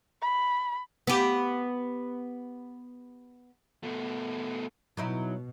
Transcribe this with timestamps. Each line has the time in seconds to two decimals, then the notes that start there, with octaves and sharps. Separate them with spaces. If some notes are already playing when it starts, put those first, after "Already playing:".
0.22 B5
1.07 B3 G4
3.83 B2 A3
4.97 B2 F#3 D#4 E4